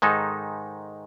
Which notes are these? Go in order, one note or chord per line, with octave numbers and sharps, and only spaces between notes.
G#2 D#3 G#3 D#4 A4